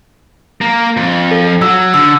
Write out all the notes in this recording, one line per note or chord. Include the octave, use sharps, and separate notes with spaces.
A#3
F2
A4
F#3 E6
D3 E6